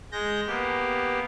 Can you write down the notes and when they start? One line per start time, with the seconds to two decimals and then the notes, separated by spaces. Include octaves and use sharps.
0.12 G#3 G6 A#6
0.47 A#3 B3 G4